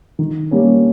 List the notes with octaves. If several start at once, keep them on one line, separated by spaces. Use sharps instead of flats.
D#3
G3 A#3 C#4